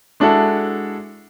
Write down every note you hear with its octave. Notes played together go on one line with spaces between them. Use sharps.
G#3 D4 E4 F#4 A4